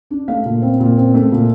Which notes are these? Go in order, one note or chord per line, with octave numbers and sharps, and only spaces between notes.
D4
A3 F5
A#2
C4
A#2
C4
A3
A#2